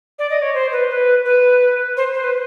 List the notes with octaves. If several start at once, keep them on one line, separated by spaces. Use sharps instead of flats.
D5
D#5
C#5
C5
B4
B4
B4
C5
C5
B4